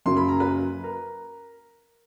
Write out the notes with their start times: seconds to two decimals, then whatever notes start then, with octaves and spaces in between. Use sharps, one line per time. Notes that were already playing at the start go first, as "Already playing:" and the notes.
0.06 F#2 C#3 F#3 A#3 C#4 C6
0.17 B5
0.28 A#5
0.40 B4 B5
0.84 A#4 A#5